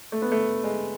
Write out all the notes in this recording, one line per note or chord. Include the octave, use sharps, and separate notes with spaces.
A3
B3
A3
G#3